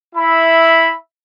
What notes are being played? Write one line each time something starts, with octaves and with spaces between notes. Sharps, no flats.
E4 E5 B5